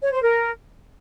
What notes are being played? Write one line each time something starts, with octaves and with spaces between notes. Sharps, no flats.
C#5
C5
A#4